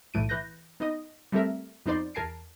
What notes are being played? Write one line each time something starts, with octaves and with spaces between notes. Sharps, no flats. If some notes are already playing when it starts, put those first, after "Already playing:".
B1 A2 E3 A3 D7 D#7
E3 B4 F#6 G6 A#6
B3 D#4 D#5 D#6
G3 A3 C4 A4 A#4 E5
F2 B3 D#4 C5 D5 C6
E2 A#4 G#5 A5 C7 D7